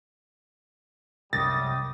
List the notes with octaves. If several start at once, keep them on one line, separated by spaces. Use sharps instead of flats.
C2 F#2 G3 G4 D#6 A6